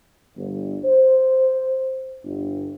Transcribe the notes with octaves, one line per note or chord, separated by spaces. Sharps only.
G1
C5
G1